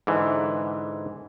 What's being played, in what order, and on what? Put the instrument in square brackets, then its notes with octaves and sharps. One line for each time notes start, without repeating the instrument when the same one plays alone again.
[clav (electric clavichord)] G#2 D3 E3